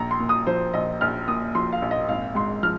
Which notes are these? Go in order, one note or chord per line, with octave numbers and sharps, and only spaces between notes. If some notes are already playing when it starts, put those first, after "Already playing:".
Already playing: A#1 A#5
C6
A#2
D#6
F3 C5
A#1 D#5
A#1 F6
A#2 D#6
F3 C6
F5
A#1
D#5
G#1 F5
G#2 C6
F3 F6